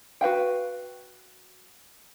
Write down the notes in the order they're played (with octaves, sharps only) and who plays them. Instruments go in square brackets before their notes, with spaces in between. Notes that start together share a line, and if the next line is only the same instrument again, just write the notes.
[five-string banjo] F#4 B4 F5 G5